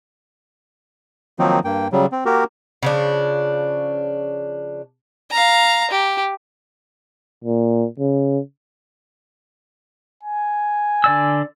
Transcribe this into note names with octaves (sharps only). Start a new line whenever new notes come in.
D#3 F3 F#3 A#3 C4 D#4
G2 A#3 G5
C#3 F#3 G3
C4
A#3 F#4 G4 A#4
C#3 F3 D4
F5 A#5
G4
A#2
C#3
G#5
D3 D5 E6